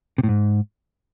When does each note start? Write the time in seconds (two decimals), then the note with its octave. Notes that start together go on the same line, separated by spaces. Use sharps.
0.18 C3
0.23 A2
0.29 G#2